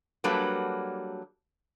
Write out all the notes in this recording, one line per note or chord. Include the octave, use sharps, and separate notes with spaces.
F#3 G3 A#3 D4 A4 B4